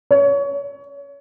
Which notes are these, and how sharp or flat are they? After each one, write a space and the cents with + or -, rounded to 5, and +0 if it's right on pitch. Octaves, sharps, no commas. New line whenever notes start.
C#5 +25